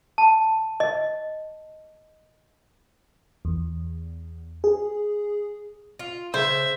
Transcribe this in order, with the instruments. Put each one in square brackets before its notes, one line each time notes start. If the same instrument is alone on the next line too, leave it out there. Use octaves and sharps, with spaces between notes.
[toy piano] A5
D#5
[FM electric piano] E2
G#4
[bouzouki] F4
[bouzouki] C#3 [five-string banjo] C5 [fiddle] E5